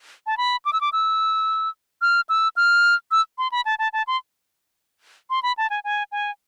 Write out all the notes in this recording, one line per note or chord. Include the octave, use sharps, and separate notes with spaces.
A5
B5
D6
E6
D6
E6
F6
E6
F6
E6
C6
B5
A5
A5
A5
C6
C6
B5
A5
G#5
G#5
G#5